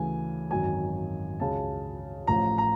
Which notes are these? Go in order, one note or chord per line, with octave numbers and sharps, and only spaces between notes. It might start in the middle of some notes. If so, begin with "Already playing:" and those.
Already playing: D2 C#3 E3 G#5
G#1 F#2 D#3 F#3 G#5
C#2 C#3 F#3 A5
A1 A2 F3 A#5
A#5